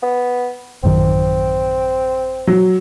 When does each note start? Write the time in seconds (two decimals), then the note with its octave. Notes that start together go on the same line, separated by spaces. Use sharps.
0.02 B3
0.83 A1 F#2 D#3 C4
2.47 F#3